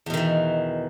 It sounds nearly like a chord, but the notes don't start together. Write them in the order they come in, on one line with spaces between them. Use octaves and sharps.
E2 B2 D#3 E3